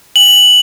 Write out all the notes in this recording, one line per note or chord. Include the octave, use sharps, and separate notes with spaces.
F#7